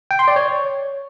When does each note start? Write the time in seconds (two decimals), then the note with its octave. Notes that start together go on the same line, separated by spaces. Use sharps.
0.11 G5
0.19 C6
0.28 D5
0.36 C#5